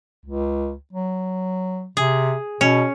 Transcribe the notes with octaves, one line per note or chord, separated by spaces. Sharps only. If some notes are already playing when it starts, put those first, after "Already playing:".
C#2
F#3
C3 G#4
B2 C#4